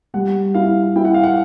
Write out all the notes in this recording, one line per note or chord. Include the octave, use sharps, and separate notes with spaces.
G3 F#5
E4 F5
E4 G5
F#5
F5
F#5